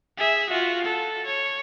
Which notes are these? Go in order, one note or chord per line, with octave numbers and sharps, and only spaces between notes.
G#4 E5
F4 F#4
A4
C#5